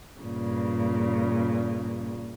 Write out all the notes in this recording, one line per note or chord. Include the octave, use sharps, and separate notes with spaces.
G2 A#2 C#3